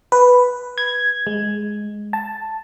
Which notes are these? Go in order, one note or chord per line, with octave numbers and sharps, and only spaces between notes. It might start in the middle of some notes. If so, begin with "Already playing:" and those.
B4
G#6
G#3
A5